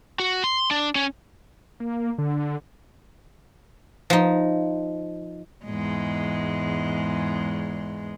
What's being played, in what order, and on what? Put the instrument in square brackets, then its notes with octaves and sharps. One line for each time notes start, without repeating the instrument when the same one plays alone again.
[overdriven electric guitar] F#4
C6
D4
C#4
[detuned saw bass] A#3
D3
[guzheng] F3 D#4
[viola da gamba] E2 G#2 G#3